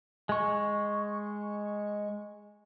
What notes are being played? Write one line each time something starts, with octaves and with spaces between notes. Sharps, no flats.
G#3 C#6